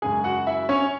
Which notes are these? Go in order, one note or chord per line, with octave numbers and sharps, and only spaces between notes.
F#2 C#3 G#3 G#4 G#5
F#4 F#5
E4 E5
C#4 C#5